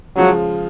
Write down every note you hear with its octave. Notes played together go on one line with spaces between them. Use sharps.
C#3 F3 F#3 G#3